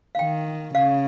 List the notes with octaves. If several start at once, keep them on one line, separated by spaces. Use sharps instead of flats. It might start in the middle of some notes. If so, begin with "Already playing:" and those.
F5
D#3 G5
C#3 F5